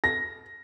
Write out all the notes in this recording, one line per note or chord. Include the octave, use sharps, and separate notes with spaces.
A#6